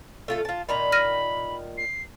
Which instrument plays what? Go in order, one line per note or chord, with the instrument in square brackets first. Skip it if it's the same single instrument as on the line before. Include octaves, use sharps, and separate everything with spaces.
[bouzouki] A3 F4 A4
F4 A5
[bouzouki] A#2 D#3 A#5 [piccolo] B5
[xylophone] F6 A#6 D#7
[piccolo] C7